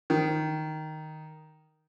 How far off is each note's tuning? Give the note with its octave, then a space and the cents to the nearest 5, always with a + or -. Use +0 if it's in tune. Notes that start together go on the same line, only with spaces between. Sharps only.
D#3 +0